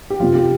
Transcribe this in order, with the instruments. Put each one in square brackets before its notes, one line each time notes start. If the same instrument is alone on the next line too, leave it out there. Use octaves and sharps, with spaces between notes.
[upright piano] G4
F2 C3 F3 F4
G4